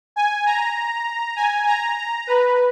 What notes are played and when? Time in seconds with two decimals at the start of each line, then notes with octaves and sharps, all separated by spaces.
0.16 G#5
0.46 A#5
1.36 G#5
1.67 A#5
1.97 A#5
2.27 B4